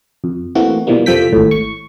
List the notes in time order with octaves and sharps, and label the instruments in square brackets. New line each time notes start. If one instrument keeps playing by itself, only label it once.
[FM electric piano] F2
E3 A3 A#3 C4 F#4
B2 E3 F3 G3 A#3
F2 C3 F3 A4 G5 B6
G#1 A2
C#6